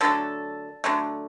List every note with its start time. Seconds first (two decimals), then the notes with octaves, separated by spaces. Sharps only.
0.01 D3 F#3 A3 A4
0.84 D3 F#3 A3